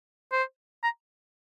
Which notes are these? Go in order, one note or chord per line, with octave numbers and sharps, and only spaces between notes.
C5
A#5